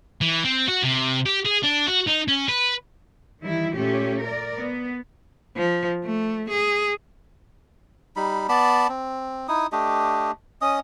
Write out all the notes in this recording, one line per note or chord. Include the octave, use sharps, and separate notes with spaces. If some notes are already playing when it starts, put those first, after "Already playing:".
E3
C4
F#4
C3
G4
G#4
D4
F#4
D#4
C#4
B4
D#3 E3 G3 E4
A#2 A3 C#4 G4
A#4 D5
B3
F3
A3
G#4
G3 D#4 B5
B3 D5 A5 B5
C4
D#4 E4 D#6
A3 D4 G4 D#5
C#4 D#5 D#6